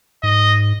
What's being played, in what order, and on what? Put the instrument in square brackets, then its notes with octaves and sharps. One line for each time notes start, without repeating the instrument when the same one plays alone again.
[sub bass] G#2 [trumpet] D#5